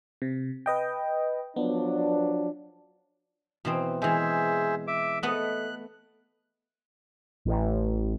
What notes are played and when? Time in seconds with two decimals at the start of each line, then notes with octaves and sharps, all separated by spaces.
0.22 C3
0.66 B4 D#5 G5
1.56 F3 F#3 B3 D4
3.65 B2 E3 C4
4.02 E3 G#3 G#4 C5 E5
4.87 E5 D6
5.23 A3 B3 D#5 F#6
7.45 A1